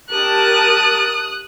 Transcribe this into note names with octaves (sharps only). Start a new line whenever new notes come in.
G4 A#4 A5 D#6 F#6